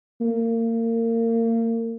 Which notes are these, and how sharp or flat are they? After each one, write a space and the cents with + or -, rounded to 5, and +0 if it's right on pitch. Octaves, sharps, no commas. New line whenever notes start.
A#3 -30